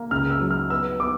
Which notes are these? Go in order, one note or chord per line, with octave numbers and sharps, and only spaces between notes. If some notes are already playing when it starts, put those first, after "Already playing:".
Already playing: A#3
C#2 F6
E6
F#3
F6
B3 E6
B3 D6